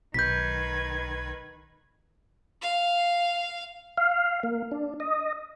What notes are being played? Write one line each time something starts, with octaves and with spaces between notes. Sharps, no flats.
B1 D#3 B4 G6 G#6 B6
F5
F5
A#3
D4
D#5